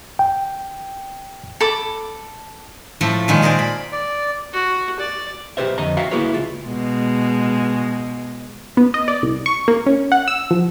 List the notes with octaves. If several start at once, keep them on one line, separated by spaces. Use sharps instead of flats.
G5
A4 B5 D6
A2 F3 A3
A#2 D#3 G#3
G#4 A#4 C5 D5
B5
D5
F#4
D5
B1 G4 B4 C5 E5
F2 D3 D#5 A#5
F#4 E5 F5 G5 A#5
A#3 E4 F#4 G#4 B4 C#5
C#2 F#3 F4
B2 G#3
B3
D#5
D5
C2
C#6
A#3
C#4
F#5
E6
F3